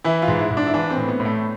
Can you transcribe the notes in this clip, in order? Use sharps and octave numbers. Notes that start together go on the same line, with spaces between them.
E3 E4
F4
G#2
E4
G#2
D4
E4
E3 D4
C4
A2
B3
A2
A3